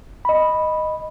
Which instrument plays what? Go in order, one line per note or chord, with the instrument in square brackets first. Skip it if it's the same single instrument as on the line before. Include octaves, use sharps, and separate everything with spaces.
[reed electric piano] D#5 B5